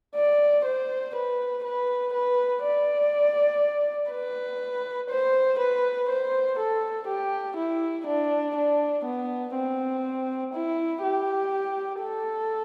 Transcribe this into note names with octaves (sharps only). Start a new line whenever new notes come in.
D5
C5
B4
B4
B4
D5
B4
C5
B4
C5
A4
G4
E4
D4
D4
B3
C4
E4
G4
A4